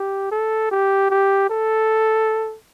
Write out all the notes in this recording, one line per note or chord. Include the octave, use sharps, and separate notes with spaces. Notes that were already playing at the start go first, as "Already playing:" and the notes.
Already playing: G4
A4
G4
G4
A4